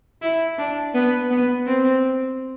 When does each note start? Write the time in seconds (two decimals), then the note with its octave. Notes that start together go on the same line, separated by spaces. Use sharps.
0.21 E4
0.58 D4
0.94 B3
1.30 B3
1.66 C4